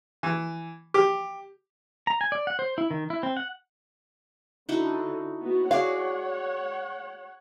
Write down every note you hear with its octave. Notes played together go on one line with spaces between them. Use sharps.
E3
G4
A#5
G#5
D5
F#5
C5
E4
D#3
E4
C4
F#5
D3 D#4 E4 F#4
B3 F#4
F#4 G#4 C#5 D5 F5 F#5